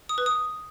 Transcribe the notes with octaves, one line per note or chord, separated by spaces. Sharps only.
D#6
B4
D#6